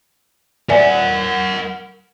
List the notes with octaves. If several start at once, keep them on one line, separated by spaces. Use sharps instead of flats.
A#4 D5 E5 F#5 G#5